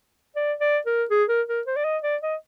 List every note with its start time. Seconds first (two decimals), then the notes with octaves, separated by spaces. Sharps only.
0.36 D5
0.60 D5
0.86 A#4
1.10 G#4
1.29 A#4
1.48 A#4
1.67 C5
1.76 D5
1.85 D#5
2.03 D5
2.22 D#5